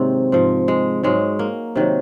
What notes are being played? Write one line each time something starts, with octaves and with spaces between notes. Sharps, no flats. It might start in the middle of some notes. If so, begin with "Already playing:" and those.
Already playing: G#2 C3 D#3 F#3 A#3 C4
G#2 F3
G#3
G#2 F#3 G#3
A#3
C3 D#3 F#3